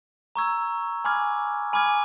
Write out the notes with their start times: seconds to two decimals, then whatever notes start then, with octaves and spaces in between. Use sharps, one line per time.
0.36 A#5 C#6 E6 G#6
1.04 G#5 B5 D6 F6 G#6
1.73 G#5 B5 D6 F6 G#6